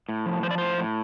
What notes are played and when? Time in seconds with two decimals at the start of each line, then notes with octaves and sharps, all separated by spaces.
0.09 A2
0.26 F3
0.43 F3 C5
0.51 D5
0.58 A2 C5
0.78 A2